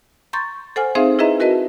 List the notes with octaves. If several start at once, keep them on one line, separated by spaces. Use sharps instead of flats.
A#5 C6 C#6 G6 A6
A4 C5 F#5 G#5 F6
C4 D#4 G#4 C5 E5 F5
E4 G#4 B4 D#5 E5 A#5
F#4 A#4 B4 D#5 A5